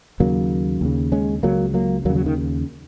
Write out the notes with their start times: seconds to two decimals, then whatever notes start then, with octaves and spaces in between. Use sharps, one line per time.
0.20 D#2 C#3 F#3 A#3
0.81 D#2 C#3
1.12 G#3 C#4
1.43 C#2 C#3 F#3 A#3
1.74 F#3 A#3
2.05 D#2 F#3 A#3
2.09 C#3
2.15 F#3
2.26 D#3